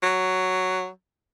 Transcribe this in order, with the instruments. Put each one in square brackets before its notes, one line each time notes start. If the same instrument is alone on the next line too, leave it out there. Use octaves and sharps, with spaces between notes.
[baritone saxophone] F#3